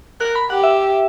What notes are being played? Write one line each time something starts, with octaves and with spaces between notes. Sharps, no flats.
A#4 F#6
B5
G4 F#5
E5